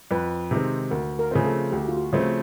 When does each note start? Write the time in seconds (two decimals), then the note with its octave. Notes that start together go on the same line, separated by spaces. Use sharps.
0.11 F2 B4
0.51 C3 D#3 G#3 C4
0.91 D2 A#4
1.19 A#4
1.31 C#3 F3 A3 C4 G#4
1.46 A4
1.72 D2 G4
1.81 F#4
1.88 F4
1.97 F#4
2.13 C#3 F3 A3 C4